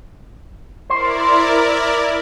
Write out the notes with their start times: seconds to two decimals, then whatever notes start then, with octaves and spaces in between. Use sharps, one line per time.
0.90 E4 A#4 C5 D5